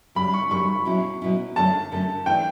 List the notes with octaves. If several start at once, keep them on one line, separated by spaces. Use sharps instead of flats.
F#2 C#3 G3 C#4 B5
C#6
F#2 C#3 G3 C#4 C#6
B2 F#3 C#4 E4
B2 F#3 C#4 E4
F#2 D3 A3 C#4 A5
F#2 D3 A3 C#4
E3 A3 D4 G5